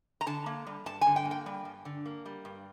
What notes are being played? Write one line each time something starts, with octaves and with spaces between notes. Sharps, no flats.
A#5
D3 A5
A#3
G3
G2 A5
G#5
D3
G5
A#3
G5
G3
G2
D3
A#3
G3
G2